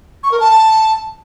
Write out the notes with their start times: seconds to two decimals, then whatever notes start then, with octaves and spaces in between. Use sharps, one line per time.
0.23 C#6
0.32 A#4
0.40 A5